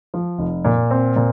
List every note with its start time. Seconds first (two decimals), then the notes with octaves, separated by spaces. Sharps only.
0.14 F3
0.38 F1
0.65 A#2
0.91 C4
1.16 A#2